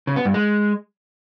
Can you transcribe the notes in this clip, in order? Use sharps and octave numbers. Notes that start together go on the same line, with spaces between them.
C#3
B3
G2
G#3